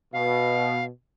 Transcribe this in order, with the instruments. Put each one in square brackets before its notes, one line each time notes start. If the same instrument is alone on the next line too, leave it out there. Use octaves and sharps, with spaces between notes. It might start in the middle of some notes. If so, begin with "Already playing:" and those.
[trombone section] B2 [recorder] F5